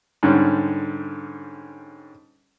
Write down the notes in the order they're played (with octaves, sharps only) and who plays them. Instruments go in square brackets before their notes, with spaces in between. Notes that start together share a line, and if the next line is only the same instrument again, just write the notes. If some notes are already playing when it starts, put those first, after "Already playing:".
[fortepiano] G#2 D3 G3 C#4